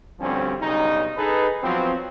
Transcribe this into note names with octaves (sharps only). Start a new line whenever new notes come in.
D2 G2 F3 G3 C4 C#4
B1 G2 C#3 D#4
D#4 G#4 A4 B4
F3 F#3 B3 C4